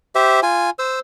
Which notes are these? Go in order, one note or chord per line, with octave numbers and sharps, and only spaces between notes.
G4 C5 E5
F4 G#5
C5 E6